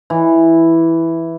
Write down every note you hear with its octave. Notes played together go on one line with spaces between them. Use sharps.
E3